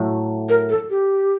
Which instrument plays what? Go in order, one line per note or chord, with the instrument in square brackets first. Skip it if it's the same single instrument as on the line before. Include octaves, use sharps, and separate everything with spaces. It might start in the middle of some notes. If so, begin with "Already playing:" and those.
Already playing: [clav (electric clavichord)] A2 F#3 A3
[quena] A#4
A4
G4